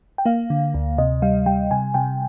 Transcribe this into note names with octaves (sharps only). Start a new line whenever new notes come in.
G5
A#3 F5
D3
D2
C3 D#5
G3 F5
G3 G5
C3 G#5
C3 G5